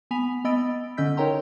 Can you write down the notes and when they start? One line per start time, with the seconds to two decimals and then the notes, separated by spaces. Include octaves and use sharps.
0.11 B3 G#5 B5 B6 F7
0.44 B3 D#5 B5 E6 A6 D7
0.97 D3 C#4 D#5 E6 G6 B6
1.17 D#4 A#4 C#5 G5 A#5 C6